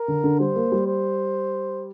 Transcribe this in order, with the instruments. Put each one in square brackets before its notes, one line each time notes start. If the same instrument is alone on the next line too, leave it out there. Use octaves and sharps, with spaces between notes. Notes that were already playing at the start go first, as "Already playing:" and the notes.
Already playing: [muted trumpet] A#4
[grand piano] D3
D3
[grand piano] G3 [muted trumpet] C5
[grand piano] A#3
G3
[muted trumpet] C5